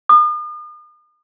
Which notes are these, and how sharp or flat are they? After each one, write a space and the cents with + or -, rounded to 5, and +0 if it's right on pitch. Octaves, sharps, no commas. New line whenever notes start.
D#6 -45